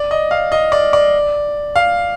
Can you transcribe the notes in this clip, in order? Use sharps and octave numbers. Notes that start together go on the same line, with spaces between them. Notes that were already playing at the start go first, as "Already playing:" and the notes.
Already playing: D5
D#5
F5
D#5
D5
D5
F5